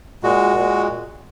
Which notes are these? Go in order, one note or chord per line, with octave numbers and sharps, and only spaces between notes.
A#2 G#3 F#4
A#2 G#3